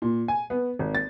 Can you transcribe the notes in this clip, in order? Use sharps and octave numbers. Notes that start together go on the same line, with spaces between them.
A#2
G#5
B3
G#1
A6